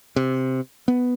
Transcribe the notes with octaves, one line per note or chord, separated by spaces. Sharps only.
C3
B3